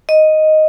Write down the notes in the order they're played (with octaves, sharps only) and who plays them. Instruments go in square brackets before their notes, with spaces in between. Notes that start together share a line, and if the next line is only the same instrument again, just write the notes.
[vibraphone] D#5